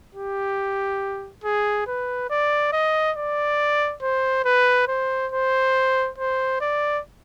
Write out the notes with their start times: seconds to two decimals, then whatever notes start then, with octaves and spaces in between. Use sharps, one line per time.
0.15 G4
1.44 G#4
1.87 B4
2.30 D5
2.73 D#5
3.17 D5
4.02 C5
4.45 B4
4.88 C5
5.32 C5
6.18 C5
6.61 D5